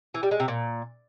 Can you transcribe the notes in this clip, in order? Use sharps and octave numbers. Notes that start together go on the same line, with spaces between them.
E3
G3
G#3
C3
A#2